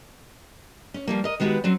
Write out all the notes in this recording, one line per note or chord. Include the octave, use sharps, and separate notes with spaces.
C#4
F3 G3 A#3
A#4 D#5
D#3 G#3 B3 F#4 G4 B4
F#3 C4 C#4